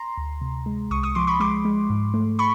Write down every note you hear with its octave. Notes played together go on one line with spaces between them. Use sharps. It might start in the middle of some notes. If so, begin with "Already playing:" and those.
Already playing: A#5 C6
D2
C3
G#3
C2 C#6 D#6
C#6 D#6
F3 C6 D6
B5 C#6
G#3 C6 D6
G#3
G#2
A3
B5 C#6